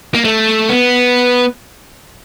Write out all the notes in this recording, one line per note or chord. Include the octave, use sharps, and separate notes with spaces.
A#3
A3
B3